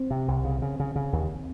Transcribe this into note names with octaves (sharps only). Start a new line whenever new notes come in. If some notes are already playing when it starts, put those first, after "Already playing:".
Already playing: C4
C3
C2
C#3
C#3
C#3
C#3
D#2